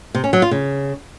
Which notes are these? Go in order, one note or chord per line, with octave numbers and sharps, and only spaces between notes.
C3
C#4
F#3
F4
C#3